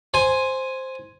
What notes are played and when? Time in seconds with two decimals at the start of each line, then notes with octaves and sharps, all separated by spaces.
0.14 C5 G#5